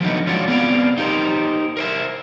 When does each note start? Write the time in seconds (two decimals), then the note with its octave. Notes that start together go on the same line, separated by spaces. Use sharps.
0.01 F3 F#3 A3 B3 D4 D#4
0.27 G#3 C#4 D4 F4 F#4
0.48 B3 C4 G#4 C#5 D5 F5
0.98 D#4 G4 A#4 C5
1.77 A#4 C5 E5